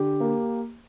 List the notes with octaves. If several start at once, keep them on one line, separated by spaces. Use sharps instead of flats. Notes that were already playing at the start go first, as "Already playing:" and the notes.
Already playing: D3 G4
A#3